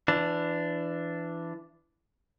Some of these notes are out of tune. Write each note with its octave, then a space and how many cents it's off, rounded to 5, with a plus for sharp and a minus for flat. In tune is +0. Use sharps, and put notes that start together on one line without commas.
E3 +25 D4 +0